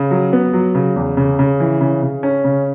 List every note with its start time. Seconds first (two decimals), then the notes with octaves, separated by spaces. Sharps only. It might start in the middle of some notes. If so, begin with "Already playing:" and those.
Already playing: C#3
0.11 F#3
0.33 B3
0.53 F#3
0.75 C#3
0.96 E2
1.17 C#3
1.39 C#3
1.60 E3
1.81 C#3
2.03 C#3
2.23 C#4
2.44 C#3